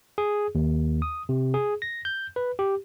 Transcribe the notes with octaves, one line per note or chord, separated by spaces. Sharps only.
G#4
D#2
D#6
C3
G#4
A#6
G6
B4
G4